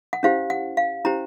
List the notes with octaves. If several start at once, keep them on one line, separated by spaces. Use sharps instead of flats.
F#5
C#4 E4 G4 C5 F5
F#5
F5
C#4 E4 G4 C5 A#5